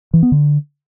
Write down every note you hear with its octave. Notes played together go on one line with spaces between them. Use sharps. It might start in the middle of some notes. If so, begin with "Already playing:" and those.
E3
B3
D3